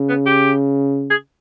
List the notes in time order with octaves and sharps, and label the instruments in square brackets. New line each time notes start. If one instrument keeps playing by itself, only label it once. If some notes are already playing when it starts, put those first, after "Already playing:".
Already playing: [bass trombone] C#3
[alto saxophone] B3
G4
G#4